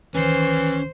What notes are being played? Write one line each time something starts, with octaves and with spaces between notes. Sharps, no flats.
C#2 D#3 E3 C#4 C5